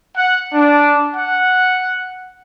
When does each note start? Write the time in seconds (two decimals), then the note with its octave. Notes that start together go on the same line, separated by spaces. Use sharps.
0.16 F#5
0.53 D4
1.16 F#5